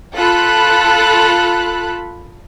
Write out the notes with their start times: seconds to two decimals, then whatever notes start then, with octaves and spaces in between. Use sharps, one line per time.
0.15 F4 A4 B5 F#6